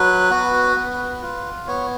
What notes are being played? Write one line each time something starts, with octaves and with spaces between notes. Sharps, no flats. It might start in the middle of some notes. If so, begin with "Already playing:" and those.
Already playing: F#3 B4
B3 F#4
B3
F4
B3 C#5